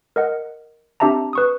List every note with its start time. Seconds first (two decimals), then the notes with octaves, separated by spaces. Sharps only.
0.16 A#4 D#5 F#5
1.00 C4 D4 G4 E5 A5 A#5
1.33 B4 C#6 D#6